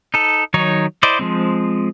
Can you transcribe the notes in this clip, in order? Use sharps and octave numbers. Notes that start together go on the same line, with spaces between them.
D#4 A4
D#3 F#3 D#4 C#5
E4 C5 D5 D#5
F3 G#3 C4